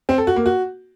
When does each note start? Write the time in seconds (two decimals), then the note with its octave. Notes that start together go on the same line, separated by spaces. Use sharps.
0.09 C4
0.18 A4
0.27 F#4
0.36 A#3
0.46 F#4